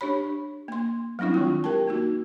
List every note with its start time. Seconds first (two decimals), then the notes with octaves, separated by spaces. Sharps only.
0.01 D4 G4 C#5 B5
0.68 A#3 C6
1.19 F#3 G3 C4 D4 E4
1.34 D#3 G#3 F4
1.64 G4 A#4 G5 A5
1.87 A#3 D#4 F#4